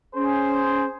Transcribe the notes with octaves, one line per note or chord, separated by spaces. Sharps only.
C#4 G#4 C5